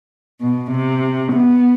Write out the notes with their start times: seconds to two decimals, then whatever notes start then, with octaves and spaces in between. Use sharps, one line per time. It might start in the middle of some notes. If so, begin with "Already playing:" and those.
0.41 B2
0.71 C3
1.32 B3